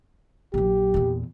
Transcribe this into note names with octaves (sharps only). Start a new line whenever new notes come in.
A#1 F#3 G4
E2 A#2